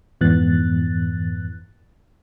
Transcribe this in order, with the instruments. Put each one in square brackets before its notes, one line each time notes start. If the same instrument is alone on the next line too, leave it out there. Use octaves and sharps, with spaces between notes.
[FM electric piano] F2 G#2 E3 B3 F#6 A6